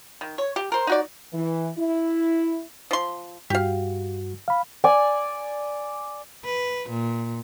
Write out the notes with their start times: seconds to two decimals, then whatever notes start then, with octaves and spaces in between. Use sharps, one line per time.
0.21 D#3
0.38 C#5
0.56 G4
0.72 A#4 C5
0.87 D#4 F#4 D5
1.33 E3
1.78 E4
2.91 F3 C6
3.50 G2 F#4 G4 F5
4.48 F5 B5
4.84 D5 G#5
6.44 B4
6.89 A#2